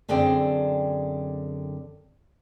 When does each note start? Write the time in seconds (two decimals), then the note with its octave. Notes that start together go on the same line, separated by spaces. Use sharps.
0.08 F#2 D3 C4 G#4 D5 G5